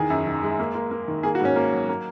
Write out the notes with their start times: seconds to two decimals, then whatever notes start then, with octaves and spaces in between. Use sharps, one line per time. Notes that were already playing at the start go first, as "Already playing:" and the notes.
Already playing: E2 D#3 G#4
0.10 F#2
0.27 D#3
0.43 G#3
0.59 A#3
0.75 A#3
0.91 A#3
1.08 D#3
1.23 A#3 G#4
1.35 F#4
1.41 G#2 C#4
1.56 A#3
1.73 F#3
1.89 A#3